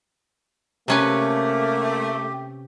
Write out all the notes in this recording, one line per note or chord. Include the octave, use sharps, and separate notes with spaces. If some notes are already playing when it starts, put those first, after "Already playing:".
C3 A3 A#3 C#4 G4 B4